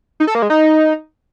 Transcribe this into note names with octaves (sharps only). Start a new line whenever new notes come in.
D#4
A4
A#3
G#3
D#4